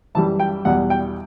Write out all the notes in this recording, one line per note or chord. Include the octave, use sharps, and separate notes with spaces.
F#2 E3 G3 A5
G5
E2 B2 G3 F#5
G5